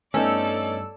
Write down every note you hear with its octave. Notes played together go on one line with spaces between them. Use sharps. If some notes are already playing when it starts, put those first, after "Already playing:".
G2 A3 B3 C#4 D#4 A4 D5 E6